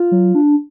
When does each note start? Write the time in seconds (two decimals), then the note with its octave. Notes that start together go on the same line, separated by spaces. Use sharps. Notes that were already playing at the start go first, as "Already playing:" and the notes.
Already playing: F4
0.11 F#3
0.35 D4